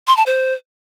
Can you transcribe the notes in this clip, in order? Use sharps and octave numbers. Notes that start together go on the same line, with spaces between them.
C6
A5
C5